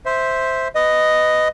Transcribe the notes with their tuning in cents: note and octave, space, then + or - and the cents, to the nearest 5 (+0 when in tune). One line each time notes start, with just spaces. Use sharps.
C5 +0 E5 -10
B4 +15 D#5 +0